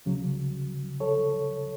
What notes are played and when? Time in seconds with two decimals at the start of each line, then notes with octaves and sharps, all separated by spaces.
0.06 C#2 C#3 F#3
1.00 A4 C#5